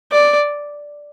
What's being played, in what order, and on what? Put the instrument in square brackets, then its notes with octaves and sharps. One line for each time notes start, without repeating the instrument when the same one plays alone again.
[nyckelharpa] D5